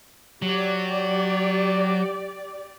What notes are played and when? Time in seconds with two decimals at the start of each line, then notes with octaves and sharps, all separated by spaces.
0.42 F#3 G4 D5